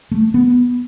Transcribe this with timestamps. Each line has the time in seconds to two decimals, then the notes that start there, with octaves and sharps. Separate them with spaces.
0.11 A3
0.34 B3